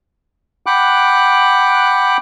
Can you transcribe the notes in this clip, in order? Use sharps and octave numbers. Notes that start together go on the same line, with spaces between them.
F#5 G5 B5 D6 F#6